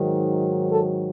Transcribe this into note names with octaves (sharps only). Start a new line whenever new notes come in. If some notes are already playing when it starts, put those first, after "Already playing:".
Already playing: G#2 D#3 F#3
A4